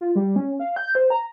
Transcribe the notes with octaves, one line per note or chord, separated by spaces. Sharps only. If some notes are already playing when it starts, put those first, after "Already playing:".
F4
G3
C#4
F5
G6
C5
A#5